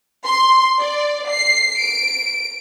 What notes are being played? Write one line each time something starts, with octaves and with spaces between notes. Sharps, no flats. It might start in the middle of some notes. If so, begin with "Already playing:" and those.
C6
D5
C7
D7